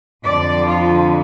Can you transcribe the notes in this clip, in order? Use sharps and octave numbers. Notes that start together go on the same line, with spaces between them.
F2 D3 F3 D5
F4